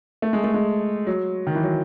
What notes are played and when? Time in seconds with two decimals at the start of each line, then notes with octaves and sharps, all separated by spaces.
0.22 A3
0.33 G#3
0.44 A3
0.54 G#3
1.07 F#3
1.47 D#3
1.55 E3
1.63 F#3